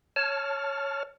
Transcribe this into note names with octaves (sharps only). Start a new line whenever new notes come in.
C#5 A5 F6